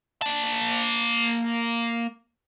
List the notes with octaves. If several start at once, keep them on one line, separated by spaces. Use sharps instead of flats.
A#3 A5